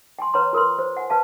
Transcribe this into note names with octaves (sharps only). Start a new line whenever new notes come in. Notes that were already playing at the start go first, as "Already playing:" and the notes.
G5 G#5 C6
B4 C#5 F#5 A#5 C6
F4 A#4 B4 C6
C5
F#5 G#5
B4 F5 A5